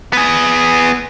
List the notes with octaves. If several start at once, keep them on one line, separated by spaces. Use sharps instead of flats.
B3 G#4